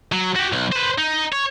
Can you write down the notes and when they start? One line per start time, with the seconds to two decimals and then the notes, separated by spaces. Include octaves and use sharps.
0.12 F#3
0.36 F#4 G4
0.53 B1
0.72 B4 C5
0.98 D#4
1.32 C#5